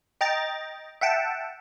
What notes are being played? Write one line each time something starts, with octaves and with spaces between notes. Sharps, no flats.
D#5 G5 A#5 A6
E5 F#5 G5 A5